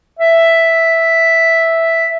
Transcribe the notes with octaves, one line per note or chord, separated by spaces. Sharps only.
E5